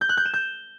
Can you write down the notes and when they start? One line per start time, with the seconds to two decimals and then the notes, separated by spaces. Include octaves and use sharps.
0.01 G6
0.09 F#6
0.17 G6
0.25 E7
0.34 G6